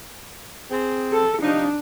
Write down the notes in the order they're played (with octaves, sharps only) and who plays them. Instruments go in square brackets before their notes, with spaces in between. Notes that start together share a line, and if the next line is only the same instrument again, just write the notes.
[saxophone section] C4 G#4
[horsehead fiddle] A4
[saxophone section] C3 F3 D#4 [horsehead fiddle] D4